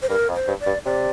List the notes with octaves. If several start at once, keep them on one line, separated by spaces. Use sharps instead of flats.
C5
G2 A#4
F2
C5
G2
D5
G2
C3 D5